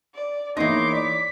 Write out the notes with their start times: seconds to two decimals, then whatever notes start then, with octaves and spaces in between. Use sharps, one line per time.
0.15 D5
0.57 E2 A#3 D#4 E4 C#5 C6 D6 A#6
0.92 D5 B6